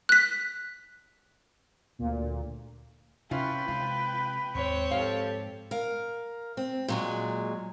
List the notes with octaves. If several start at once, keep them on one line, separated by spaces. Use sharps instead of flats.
F#6 B6
D2 A#2
C3 C#4 E4 F4 B4 G5
C3 G#3 C4 F4
D#2 G#2 C4 C#5
G#2 F3 G4 A4 F5
A#4 F5
C4
A#2 F#3 G#3